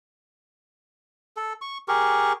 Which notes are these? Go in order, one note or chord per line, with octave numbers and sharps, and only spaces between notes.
A4
C#6
G4 G#4 A#4 C#6